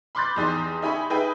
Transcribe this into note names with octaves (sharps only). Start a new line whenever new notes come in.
B5 C6 D6 F#6 G6 A6
E2 D#4 G4 C6
D#4 E4 G4 G#5 B5 C#6
D#4 G#4 B4 E5 G5 B5